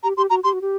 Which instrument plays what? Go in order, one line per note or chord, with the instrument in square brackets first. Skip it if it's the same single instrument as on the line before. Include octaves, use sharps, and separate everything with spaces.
[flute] G4 [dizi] A#5
[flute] G4 [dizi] C6
[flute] F#4 [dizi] A#5
[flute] G4 [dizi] C6
[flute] F#4
G4